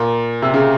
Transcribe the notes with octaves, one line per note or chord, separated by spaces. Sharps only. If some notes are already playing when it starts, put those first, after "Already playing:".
Already playing: A#2
C3
C#3